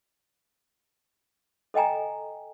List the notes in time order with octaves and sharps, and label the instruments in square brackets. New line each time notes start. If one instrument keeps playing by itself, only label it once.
[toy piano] A4 D#5 G5 G#5 A#5